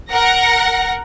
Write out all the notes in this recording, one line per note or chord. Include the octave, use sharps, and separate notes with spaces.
A#4 F#5 A#6